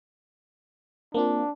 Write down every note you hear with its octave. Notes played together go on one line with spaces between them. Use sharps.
A#3 C4 D4 F4